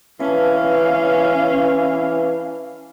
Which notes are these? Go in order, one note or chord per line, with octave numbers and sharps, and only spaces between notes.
E3 C#4 B4 F5 A5